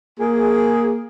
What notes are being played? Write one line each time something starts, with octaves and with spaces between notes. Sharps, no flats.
A#3 G#4